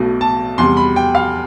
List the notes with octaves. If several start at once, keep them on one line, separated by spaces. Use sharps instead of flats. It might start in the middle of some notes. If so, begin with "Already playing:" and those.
Already playing: B1 B2 A3
A5
E2 C3 G3 C6
B5
G5
F5